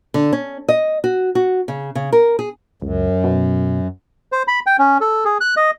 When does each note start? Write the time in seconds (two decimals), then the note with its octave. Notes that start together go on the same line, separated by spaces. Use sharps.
0.14 D3
0.33 C#4
0.69 D#5
1.04 F#4
1.35 F#4
1.68 C#3
1.95 C#3
2.12 A#4
2.39 G#4
2.82 C#2 F#2
3.24 B2
4.32 C5
4.48 B5
4.66 G5
4.79 C#4
5.01 A4
5.25 G#4
5.41 F#6
5.57 D#5